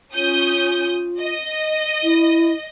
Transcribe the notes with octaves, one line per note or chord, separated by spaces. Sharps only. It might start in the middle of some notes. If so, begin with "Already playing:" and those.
C#4 F4 D#6 G6
D#5
E4